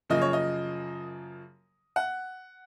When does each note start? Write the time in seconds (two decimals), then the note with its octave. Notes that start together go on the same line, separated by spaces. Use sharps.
0.10 F#2 C#3 F3 A#3 D#5
0.22 C#5
0.33 D#5
1.96 F#5